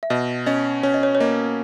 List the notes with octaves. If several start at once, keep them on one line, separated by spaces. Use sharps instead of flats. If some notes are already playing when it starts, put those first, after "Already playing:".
E5
B2 D#5
C#4 D#5
C#4 C#5
D#5
C#5
C#5
A#3 D#5